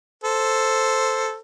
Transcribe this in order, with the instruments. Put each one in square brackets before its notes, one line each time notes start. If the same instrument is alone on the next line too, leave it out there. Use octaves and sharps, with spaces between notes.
[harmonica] A4 C5